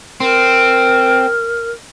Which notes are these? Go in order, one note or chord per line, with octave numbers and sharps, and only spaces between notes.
C4 A#4